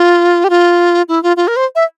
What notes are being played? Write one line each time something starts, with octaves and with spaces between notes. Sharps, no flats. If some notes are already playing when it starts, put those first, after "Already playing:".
Already playing: F4
G4
F4
E4
F4
F4
A#4
C5
E5